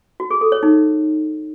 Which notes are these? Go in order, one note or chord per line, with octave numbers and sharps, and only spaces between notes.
F#4
G#4
A4
C#5
D#4